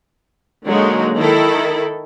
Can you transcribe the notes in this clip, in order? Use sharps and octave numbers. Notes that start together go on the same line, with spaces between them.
D3 F#3 G#3 A#3 D#4
D#3 E4 A4